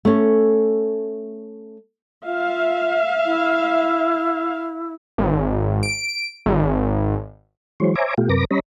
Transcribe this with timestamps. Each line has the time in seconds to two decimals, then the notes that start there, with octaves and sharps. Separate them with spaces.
0.05 A3 C#4
2.25 F4 E5 F5
3.25 E4
5.18 G#1
5.83 D7
6.46 G#1
7.80 E3 F#3 G#3 C5 C#5
7.95 C5 C#5 E5 G#5 A#5 D6
8.18 B2 A3 F4 G4
8.29 F#2 C3 A#4 B4 D6 A#6
8.51 G3 C#4 C#5 D#5 A#5 B5